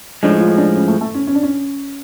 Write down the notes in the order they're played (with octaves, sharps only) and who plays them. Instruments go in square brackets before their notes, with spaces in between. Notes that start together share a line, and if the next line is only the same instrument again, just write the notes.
[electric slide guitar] A2 F3 G#3 [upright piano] D4
[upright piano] F4
D4
C#4
A3
A3
C#4
C#4
D4
C#4